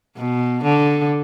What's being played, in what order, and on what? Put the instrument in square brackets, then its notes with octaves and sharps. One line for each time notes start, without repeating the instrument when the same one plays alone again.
[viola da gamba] B2
D3